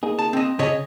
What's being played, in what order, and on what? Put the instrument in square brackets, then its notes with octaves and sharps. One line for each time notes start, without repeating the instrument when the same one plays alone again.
[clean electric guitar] A#3 D#4 G#4
[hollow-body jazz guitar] A5
C4 D#5
[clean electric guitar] C#3 [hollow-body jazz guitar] C#5 D#5 G#5